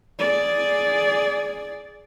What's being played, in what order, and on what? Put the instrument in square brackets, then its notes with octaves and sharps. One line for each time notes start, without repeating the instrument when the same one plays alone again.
[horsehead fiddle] G#4 D5